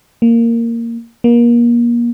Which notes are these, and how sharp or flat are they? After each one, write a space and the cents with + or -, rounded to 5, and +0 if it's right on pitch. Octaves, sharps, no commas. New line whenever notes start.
A#3 -10
A#3 +30